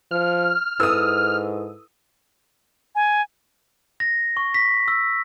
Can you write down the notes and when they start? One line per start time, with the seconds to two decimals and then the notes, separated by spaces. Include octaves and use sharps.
0.11 F3 F6
0.80 G#2 E4 A4 B4 D#6 E6
2.95 G#5
4.00 A#6
4.37 C#6
4.54 B6
4.88 E6